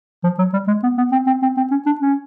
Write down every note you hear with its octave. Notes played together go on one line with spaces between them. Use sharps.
F3
F#3
G3
G#3
B3
B3
C4
C4
C4
C4
C#4
D4
C#4